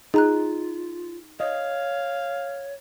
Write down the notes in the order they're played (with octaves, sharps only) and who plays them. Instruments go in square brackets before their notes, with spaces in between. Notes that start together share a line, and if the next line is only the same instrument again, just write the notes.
[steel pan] D#4 [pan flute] F4 [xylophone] G#4 A#5 F#6
[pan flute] C#5 [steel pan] D#5 [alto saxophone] F5